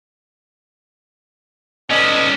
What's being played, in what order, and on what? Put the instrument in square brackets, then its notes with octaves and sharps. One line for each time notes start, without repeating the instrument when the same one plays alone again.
[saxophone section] B3 A4 D#5 [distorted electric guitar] C#4 D5